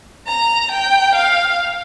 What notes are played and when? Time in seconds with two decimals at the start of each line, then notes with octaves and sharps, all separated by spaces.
0.27 A#5
0.71 G5
1.15 F5